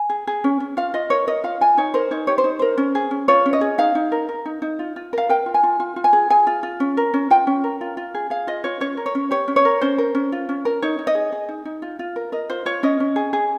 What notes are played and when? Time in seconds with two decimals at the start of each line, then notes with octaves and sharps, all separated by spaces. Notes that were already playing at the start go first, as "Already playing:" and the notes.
Already playing: G#5
0.10 G#4
0.27 G#4
0.44 C#4
0.60 C#4
0.77 F4 F5
0.94 F4 D#5
1.10 A#4 C#5
1.27 A#4 D#5
1.44 F4 F5
1.61 F4 G#5
1.77 D#4 C#5
1.94 A#4 C5
2.11 D#4 C#5
2.27 G4 C#5
2.38 C5
2.44 D#4
2.59 A#4 C5
2.78 C#4
2.95 G#4
3.11 C#4
3.28 F4 C#5
3.46 C#4
3.53 D#5
3.61 G#4
3.78 D#4 F5
3.95 D#4
4.12 A#4
4.29 A#4
4.45 D#4
4.62 D#4
4.79 F4
4.96 F4
5.13 A#4 F5
5.29 A#4 G5
5.46 F4
5.54 G#5
5.63 F4
5.80 F4
5.96 F4
6.04 G#5
6.13 G#4
6.30 G#4 G#5
6.47 F4
6.63 F4
6.80 C#4
6.97 A#4
7.14 C#4
7.30 F4 G5
7.47 C#4
7.64 A#4
7.81 F4
7.97 F4
8.14 G#4
8.30 G#4 F5
8.47 F4 D#5
8.64 F4 C#5
8.81 C#4 C#5
8.97 A#4
9.06 C#5
9.15 C#4
9.31 G4 C#5
9.48 C#4
9.56 C#5
9.65 A#4
9.81 C#4 C5
9.98 A#4
10.15 C#4
10.32 F4
10.49 C#4
10.65 A#4
10.82 D#4 C#5
10.99 D#4
11.07 D#5
11.15 G#4
11.32 G#4
11.49 D#4
11.65 D#4
11.82 F4
11.99 F4
12.16 A#4
12.32 A#4 D#5
12.50 F4 C5
12.66 F4 C#5
12.83 C#4 D#5
13.00 C#4
13.16 G#4
13.33 G#4